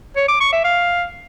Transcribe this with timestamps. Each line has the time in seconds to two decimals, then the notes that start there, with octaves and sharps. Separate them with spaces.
0.16 C#5
0.28 D6
0.40 C#6
0.52 E5
0.64 F5